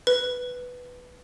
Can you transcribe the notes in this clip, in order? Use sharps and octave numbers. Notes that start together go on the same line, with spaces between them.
B4